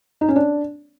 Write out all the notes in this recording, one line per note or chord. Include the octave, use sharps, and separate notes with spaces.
D#4
C#4
D4